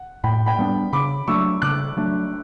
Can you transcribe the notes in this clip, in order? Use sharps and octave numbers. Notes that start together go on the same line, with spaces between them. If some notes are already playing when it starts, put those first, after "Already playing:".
Already playing: F#5
A2 G5 B5
G5 B5
G3 B3 D4
C#3 B5 D6
F#3 A3 D4 C#6 E6
C#3 D6 F#6
F#3 A3 D4